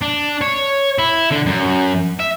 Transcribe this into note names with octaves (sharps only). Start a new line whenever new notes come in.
D4
C#5
E4
D3
F#2
E5